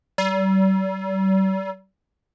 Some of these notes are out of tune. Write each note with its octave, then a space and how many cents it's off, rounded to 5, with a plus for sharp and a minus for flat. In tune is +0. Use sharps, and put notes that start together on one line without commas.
G3 -40